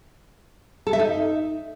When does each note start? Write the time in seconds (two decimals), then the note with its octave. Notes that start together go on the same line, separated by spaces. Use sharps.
0.87 A4
0.93 E5
1.00 D#4